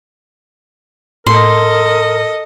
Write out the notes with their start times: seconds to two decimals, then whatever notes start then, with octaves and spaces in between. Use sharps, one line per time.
1.27 A2 A4 A#4 D#5 C6